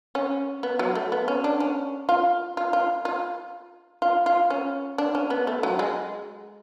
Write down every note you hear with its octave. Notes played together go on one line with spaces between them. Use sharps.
C#4
B3
F#3
A3
B3
C#4
D4
C#4
F4
F4
F4
F4
F4
F4
C#4
D4
C#4
B3
A3
F#3
G#3